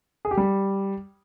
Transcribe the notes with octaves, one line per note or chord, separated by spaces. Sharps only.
G#4
G4
G3